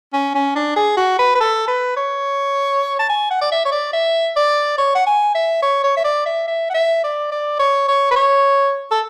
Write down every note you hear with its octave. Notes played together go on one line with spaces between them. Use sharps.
C#4
C#4
D4
G#4
F#4
B4
B4
A4
B4
C#5
A5
G#5
F#5
D5
E5
C#5
D5
E5
D5
C#5
F#5
G#5
E5
C#5
C#5
E5
D5
E5
E5
F#5
E5
D5
D5
C#5
C#5
B4
C#5
A4